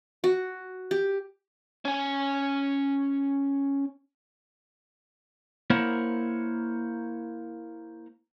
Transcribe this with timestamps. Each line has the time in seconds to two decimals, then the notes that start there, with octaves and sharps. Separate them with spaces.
0.24 F#4
0.91 G4
1.85 C#4 G#5
5.70 A#3 E4 A#4 C5 C#5 F#5